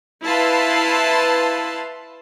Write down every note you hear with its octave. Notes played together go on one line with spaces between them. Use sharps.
E4 B4 F5 A5 C6